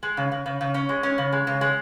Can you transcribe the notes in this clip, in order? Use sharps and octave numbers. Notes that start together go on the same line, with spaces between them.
G#3
C#3
C#3
C#3
C#3
C#4
G#3
C#4
C#3
G#3
C#3
G#3